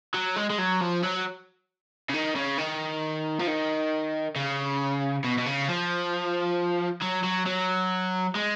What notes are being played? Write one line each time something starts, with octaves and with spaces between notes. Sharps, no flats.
F#3
G#3
G#3
F#3
F3
F#3
C#3
D#3
C#3
D#3
F3
D#3
C#3
B2
B2
C#3
F3
F#3
F#3
F#3
G#3